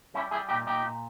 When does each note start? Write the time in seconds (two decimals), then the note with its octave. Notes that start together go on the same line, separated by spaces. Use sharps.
0.14 G3 C#4 E4
0.31 G3 E4 G#4
0.49 A#2 D#4 G4
0.66 A#2 D#4 G4
0.84 A#2